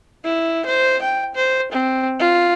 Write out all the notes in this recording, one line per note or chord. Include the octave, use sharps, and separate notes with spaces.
E4
C5
G5
C5
C4
F4